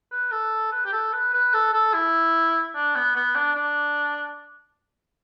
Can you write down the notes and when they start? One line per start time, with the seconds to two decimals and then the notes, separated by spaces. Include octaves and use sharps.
0.12 B4
0.31 A4
0.72 B4
0.85 G4
0.92 A4
1.13 B4
1.33 B4
1.53 A4
1.73 A4
1.94 E4
2.75 D4
2.95 B3
3.15 B3
3.35 D4
3.55 D4